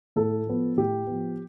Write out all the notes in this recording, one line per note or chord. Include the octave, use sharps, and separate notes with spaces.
A2 A4
F3 B3
A2 G4
F3 B3